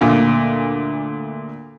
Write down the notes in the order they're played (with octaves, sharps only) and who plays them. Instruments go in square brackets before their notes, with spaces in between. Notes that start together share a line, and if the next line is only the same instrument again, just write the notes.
[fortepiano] D2 A#2